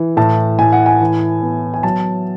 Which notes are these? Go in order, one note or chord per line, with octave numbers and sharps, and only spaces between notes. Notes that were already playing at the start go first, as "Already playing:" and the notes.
Already playing: E3
A2 A5
A2 G#5
F#5
G#5
E3
B3
G#5
F#3 A5